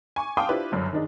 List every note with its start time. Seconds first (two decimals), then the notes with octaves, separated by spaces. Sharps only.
0.16 G#5 C#6 D6
0.37 F5 G5 A5 C6 D6 D#6
0.49 D4 E4 F4 G4 B4 C5
0.72 G1 F#2 D5
0.93 D#3 D4 D#4 G#4